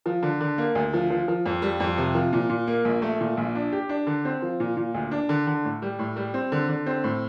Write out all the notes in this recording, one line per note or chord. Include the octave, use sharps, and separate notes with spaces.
F3
D3
D3
A#3
D2
F3
F3
F3
F2
G3
F2
C3
F3
A#2
A#2
A#3
A#1
A3
A#2
A#1
D4
G4
D4
D3
C4
F3
A#2
A#2
D2
D4
D3
D3
A2
G3
A2
G3
C4
D3
D3
C4
A2